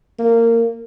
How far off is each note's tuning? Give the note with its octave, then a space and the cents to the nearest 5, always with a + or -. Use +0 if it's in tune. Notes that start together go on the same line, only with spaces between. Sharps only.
A#3 -20